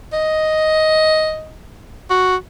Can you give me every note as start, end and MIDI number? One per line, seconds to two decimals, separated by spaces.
0.12 1.54 75
2.10 2.36 66